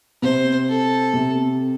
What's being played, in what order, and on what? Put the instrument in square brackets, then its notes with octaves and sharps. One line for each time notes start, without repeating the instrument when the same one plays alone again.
[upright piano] C3 [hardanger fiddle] C5
[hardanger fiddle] A4
[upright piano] C3